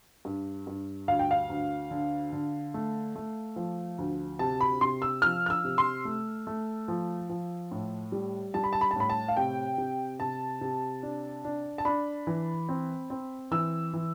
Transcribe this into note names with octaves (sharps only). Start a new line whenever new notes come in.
G2
G2
D2 F5
G5
F5
D2
D3
D3
A3
A3
F3
D2
C3 A5
B5
C3 C6
E6
F3 F6
F6
E6
C3
C6
A3
A3
F3
F3
A2
G3
G3 A5
B5
A5
B5
A5
A2 B5
A5
F5
C3 G5
C3
C3 A5
C3
D4
D4
A5
D4 B5
E3
C4
C4
E3 E6
E3